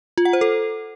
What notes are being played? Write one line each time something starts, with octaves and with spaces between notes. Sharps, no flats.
F4
F#5
C5
A4